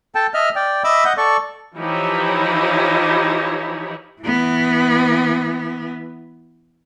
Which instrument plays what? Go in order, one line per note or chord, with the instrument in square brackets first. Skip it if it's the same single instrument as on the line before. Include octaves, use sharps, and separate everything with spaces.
[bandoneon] A4 G5 A5
D#5 E5 F6
D5 G5
D#5 E5 B5 D6 E6
D#5 F#5 G6
A4 D5 C#6
[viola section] E3 F3 D#4 E4 G4 C#5
[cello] E3 B3